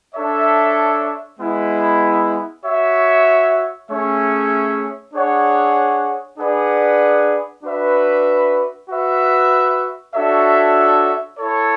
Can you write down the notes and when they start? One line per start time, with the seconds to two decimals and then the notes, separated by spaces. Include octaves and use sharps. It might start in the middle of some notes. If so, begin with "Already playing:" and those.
0.14 D4 A4 C#5 E5
1.39 G#3 B3 E4
2.64 F#4 C#5 E5
3.89 A3 C#4 G#4 C#5 E5
5.14 D4 G#4 C#5 F#5
6.38 D4 G#4 B4 D5 F#5
7.64 D4 F#4 B4 E5
8.89 F#4 B4 E5
10.13 D4 F#4 A4 C#5 E5
11.38 E4 A4 C#5